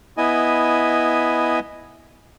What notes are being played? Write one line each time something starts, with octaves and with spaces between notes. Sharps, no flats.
B3 E4 D#5 G#5